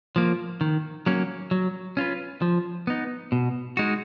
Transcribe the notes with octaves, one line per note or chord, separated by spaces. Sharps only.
F3 A#3
D#3
F#3 A#3 C#4
F#3
C#4 F4 B4
F3
B3 D#4
B2
G#3 D#4 F#4